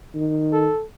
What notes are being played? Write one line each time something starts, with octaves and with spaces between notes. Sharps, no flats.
D#3
A4